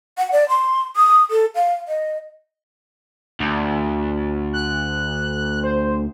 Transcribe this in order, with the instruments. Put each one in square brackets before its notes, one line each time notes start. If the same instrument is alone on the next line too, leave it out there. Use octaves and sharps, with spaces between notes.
[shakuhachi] F#5
D5
C6
D#6
A4
F5
D#5
[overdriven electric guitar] D2
[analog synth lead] F#6
C5